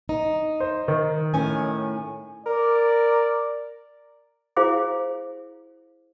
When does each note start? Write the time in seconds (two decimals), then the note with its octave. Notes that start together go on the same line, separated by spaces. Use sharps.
0.09 D#4
0.60 C5
0.88 D#3
1.34 A2 C#4 G#5
2.46 A#4 D5
4.57 E4 G#4 C5 F5 D6